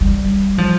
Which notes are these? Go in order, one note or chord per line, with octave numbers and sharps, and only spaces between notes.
G3
F3